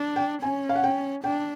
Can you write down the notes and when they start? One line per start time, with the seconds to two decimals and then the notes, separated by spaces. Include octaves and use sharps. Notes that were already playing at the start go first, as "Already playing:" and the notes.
Already playing: D4
0.16 G5
0.42 C#4 G#5
0.69 F5
0.76 F#5
0.84 G5
1.24 D4 G5